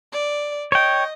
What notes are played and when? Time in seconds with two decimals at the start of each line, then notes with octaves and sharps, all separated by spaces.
0.12 D5
0.72 C#5 D#5 G5